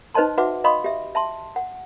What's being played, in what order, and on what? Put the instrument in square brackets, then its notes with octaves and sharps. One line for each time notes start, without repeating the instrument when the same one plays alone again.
[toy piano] D#4 B4 C5 D#5 A5 C6
F#4 B4 E5 F#5 D6
D#5 F5 B5 C6 D#6
G4 E5
E5 A5 C6
F#5